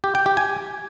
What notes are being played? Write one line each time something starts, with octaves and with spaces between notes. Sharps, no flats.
G4
G5
G4
G#5